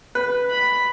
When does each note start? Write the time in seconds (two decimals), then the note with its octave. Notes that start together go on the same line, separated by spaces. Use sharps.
0.15 B4
0.50 B5